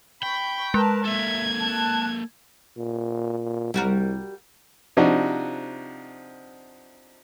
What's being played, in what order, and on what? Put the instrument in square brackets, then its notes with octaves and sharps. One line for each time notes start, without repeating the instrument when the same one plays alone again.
[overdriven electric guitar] G5 [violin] B5 [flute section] C#6
[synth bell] G#3 [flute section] A#4 A5 [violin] B4
[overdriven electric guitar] A#3 A4 [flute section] E5 [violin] G#6
[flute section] A5 F#6
[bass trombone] A#2
[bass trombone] C2 [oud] G3 F#4 A#4
[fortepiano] C3 F3 D4 D#4 F#4